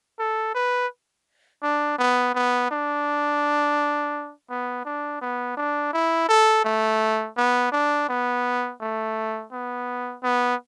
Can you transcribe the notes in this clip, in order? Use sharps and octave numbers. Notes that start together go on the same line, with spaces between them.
A4
B4
D4
B3
B3
D4
B3
D4
B3
D4
E4
A4
A3
B3
D4
B3
A3
B3
B3